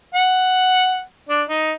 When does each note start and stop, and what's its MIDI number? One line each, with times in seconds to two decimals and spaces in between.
0.14 1.00 78
1.29 1.42 62
1.49 1.71 63